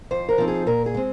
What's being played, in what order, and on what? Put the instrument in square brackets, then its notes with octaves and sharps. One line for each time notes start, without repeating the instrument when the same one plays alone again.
[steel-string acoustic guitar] F2 C5
A#4
F3 C4 D#4
G#4
A#2 A#4
G#4
G#3 C4